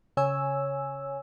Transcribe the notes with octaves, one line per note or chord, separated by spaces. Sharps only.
C#3 C#5 G#5 E6